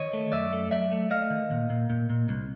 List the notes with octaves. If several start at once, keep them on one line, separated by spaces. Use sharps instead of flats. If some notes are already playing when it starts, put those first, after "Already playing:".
Already playing: D#3 C#5 D#5
A3
F#2 D5 E5
A3
F#3 D5 E5
A3
A3 D#5 F5
D#3
A#2
A#2
A#2
A#2
C2